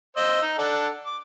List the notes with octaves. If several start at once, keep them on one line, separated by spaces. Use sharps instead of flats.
C5 D#5 E6
D#4
D4 A4 F#5
D6